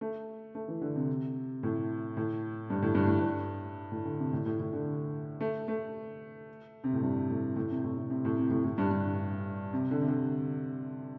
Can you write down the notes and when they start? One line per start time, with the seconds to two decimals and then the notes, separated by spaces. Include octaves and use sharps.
0.01 A3
0.55 A3
0.68 E3
0.82 D3
0.95 C3
1.63 A2
2.17 A2
2.70 G2
2.82 A2
2.95 G2
3.07 A2
3.19 G2
3.92 A2
4.05 D3
4.19 C3
4.33 A2
4.46 A2
4.60 A2
4.73 D3
5.41 A3
5.68 A3
6.84 C3
6.93 A2
7.02 G2
7.30 A2
7.56 A2
7.71 C3
7.84 A2
7.97 C3
8.10 C3
8.25 A2
8.38 C3
8.51 A2
8.64 A2
8.78 G2
8.91 G2
9.73 C3
9.91 D3
10.02 C3
10.08 D3